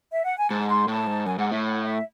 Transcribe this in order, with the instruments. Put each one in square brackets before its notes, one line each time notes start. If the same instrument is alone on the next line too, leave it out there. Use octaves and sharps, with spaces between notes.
[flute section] E5
F#5
G#5
[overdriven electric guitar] G#2 [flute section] A5
[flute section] C6
[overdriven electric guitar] A2 [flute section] A5
[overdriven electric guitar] G#2
[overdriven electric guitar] F#2 [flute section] G#5
[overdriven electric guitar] G#2 [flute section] F#5
[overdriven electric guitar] A2 [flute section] E5
[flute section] F#5
E5